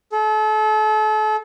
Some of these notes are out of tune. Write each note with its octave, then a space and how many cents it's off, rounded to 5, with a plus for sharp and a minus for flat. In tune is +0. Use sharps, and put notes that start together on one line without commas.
A4 -35